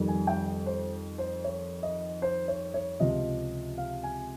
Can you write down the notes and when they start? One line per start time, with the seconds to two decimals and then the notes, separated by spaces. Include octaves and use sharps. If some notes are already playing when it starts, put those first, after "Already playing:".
Already playing: F2 D#3 G3
0.08 G#5
0.27 G5
0.66 C5
1.18 C5
1.44 C#5
1.83 D#5
2.22 C5
2.48 C#5
2.74 C#5
3.00 C#2 C3 F3 D#5
3.78 F5
4.03 G#5